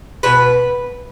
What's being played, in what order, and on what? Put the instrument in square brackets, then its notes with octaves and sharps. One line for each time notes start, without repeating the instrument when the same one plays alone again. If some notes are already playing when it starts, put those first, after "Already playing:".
[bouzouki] B2 B4